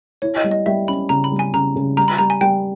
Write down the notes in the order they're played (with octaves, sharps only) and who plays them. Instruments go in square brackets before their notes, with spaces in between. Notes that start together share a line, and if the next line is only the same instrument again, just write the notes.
[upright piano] E4 [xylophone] C#5
[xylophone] D#5
[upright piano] G3
[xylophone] D#5
[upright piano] G3 [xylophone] E5
[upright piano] C#4 [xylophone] B5
[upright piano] C#3 [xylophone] A#5
[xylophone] B5
[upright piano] G3
[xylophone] G#5
[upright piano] C#3 [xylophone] A#5
[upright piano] C#3
[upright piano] G3 [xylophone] A#5
[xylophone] B5
[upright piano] G3 [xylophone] A#5
[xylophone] G#5
[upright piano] G3 [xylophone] G5